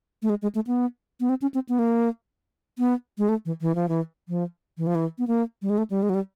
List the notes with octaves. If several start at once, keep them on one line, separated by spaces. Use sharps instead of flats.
A3
G#3
G#3
A3
B3
B3
C4
C#4
C4
B3
A#3
B3
G#3
A3
E3
E3
F3
E3
F3
E3
F3
E3
B3
A#3
G3
G#3
A3
G3
G#3
F#3
G3